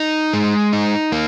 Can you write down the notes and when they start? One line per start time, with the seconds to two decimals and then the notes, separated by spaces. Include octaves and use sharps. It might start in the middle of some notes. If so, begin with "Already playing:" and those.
Already playing: D#4
0.33 G#3
0.73 D#4
1.12 A#3